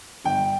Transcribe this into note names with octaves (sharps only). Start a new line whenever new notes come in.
G1 G5